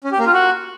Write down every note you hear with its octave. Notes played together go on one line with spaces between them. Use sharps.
C#4
G4
A#3
F4
F#4